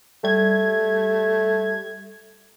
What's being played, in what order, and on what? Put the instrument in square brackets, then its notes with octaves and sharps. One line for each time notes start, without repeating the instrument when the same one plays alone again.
[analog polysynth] G3 G#6 [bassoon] A3